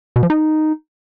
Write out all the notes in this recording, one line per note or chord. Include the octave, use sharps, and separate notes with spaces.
B2
F3
D#4